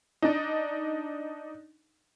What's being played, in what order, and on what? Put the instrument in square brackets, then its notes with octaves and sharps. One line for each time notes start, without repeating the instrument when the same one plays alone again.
[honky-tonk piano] D4 D#4